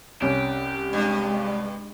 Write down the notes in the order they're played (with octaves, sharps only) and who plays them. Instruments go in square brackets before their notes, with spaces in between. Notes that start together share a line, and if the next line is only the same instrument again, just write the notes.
[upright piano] C2 C#4 [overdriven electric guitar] G4
[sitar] G2 [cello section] G#3